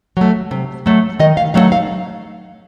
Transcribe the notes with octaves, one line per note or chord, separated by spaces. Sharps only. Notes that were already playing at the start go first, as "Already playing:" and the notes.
F#3 A3
C3
F#3 A3
D#3 D#5
F5
F#3 A3 C4 D#4 F5
F5